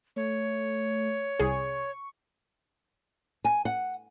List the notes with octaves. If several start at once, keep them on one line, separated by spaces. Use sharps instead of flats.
A3 C#5
C2 G#4 C#6
G#5
F#5